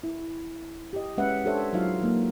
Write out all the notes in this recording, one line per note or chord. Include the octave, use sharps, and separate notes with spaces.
E4
G4 D#5
G#3 C#4 B4 E5 F#5
D4 G4 A4 C5 C#5 E5
F#3 D#4 F4 F#4 F5
F#3 A#3 D#4